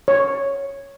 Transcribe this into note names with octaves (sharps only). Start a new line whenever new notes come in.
C#5